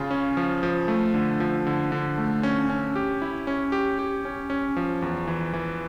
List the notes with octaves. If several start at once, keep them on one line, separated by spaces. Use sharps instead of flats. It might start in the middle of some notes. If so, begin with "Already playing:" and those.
Already playing: C#3 C#4 F4
C#4
F3
F3
A3
D3
F3
D3
D3
A3
C#4
C#4
G4
E4
C#4
G4
G4
C#4
C#4
F3
E2
E3
E3